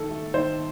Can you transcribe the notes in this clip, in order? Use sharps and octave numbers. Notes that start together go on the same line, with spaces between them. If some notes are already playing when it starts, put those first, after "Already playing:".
Already playing: D#3 A3 A4
A3
D#3 C5